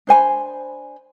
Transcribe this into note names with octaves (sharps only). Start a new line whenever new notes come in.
D4 C5 G#5 B5